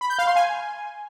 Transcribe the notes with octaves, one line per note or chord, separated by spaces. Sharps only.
B5
G6
F5
C6
G#5